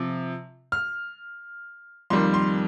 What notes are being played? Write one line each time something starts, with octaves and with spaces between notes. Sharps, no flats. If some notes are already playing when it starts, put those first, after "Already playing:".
Already playing: C3 F3
F6
F2 D#3 G3 A#3 C6
C6